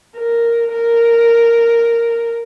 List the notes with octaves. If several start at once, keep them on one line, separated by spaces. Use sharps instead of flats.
A#4
A#4